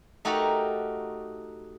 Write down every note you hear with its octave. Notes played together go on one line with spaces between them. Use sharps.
A3 D#4 F#4 G4 A4 A#4